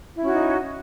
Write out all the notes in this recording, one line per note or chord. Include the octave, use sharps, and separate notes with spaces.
C#4 D#4 E4 F#4